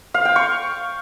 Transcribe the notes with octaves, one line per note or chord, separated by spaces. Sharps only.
F5
G5
C#6